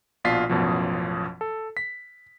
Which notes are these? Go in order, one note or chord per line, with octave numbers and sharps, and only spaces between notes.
A#1 B2 F4 D5 B6 C7
A1 F#2 B2 F3
A4
B6